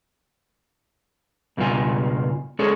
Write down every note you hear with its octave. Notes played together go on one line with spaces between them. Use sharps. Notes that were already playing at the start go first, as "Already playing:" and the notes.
C#2 G2 B2 G3 F4 G#5
G#3 C#4 G#4 A4 C#5